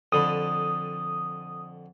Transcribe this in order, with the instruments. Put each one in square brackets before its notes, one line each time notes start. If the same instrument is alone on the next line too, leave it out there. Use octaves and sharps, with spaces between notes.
[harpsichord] F2 D3 B5 [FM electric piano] D#6